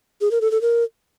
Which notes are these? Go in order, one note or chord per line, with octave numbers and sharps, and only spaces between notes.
G#4
A#4
A4
A4
A#4